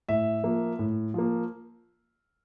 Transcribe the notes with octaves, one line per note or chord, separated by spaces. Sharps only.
A2 E5
F3 A#3
A2
F3 A#3